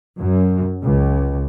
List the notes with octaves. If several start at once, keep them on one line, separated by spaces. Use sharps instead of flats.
F#2
C#2